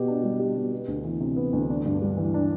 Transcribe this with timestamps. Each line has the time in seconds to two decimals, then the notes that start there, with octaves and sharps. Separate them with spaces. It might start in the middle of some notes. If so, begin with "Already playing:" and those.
Already playing: B2 G4
0.08 D4
0.23 G3
0.40 G4
0.56 B2
0.72 B3
0.88 D2
1.05 E3
1.20 C3
1.36 B3
1.53 D2
1.70 D4
1.85 G2
2.02 G3
2.17 E3
2.34 D4